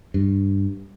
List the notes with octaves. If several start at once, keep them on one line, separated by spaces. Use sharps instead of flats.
G2